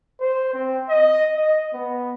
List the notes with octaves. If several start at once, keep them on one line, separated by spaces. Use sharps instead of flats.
C5
C4
D#5
D#5
B3